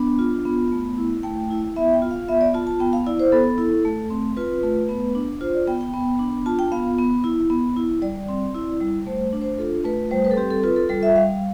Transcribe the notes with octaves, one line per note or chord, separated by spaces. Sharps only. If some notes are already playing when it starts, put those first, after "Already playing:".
Already playing: B3 D4
F4
B3
A3
E4
A3 G5
E4
B3 E5
G5
F4
F5
B3 E5
D5
F4 A5
A5
B3 G5
F5
E4 D5
C5
B3 A4
E4
A3
C4
F4 B4
A3
B3
D4
F4 C5
D5
B3 G5
G5
B3
D4
F4 A5
G5
B3 F5
B3
E4
B3
E4
G3 D5
C4
E4
G3
A3 C5
D4
C5
F4 A4
A3 B4
G3 C5
B4
A4
C4 G4
A4
F4 B4
A4
G3 A4
E5
G3 F5